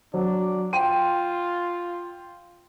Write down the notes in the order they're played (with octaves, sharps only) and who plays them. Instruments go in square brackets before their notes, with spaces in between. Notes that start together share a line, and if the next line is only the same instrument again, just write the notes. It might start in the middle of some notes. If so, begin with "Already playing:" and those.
[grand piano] F#3 [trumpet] D4
[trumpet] F4 [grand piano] G5 C6 D#7